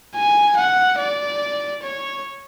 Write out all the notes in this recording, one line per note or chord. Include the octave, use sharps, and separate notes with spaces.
G#5
F#5
D5
C#5